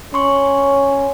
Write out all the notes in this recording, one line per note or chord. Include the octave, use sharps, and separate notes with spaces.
C#4 C6 C#6